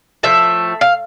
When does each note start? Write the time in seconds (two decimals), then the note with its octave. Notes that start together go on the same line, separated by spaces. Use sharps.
0.23 A2 F3 A3 E5
0.81 F5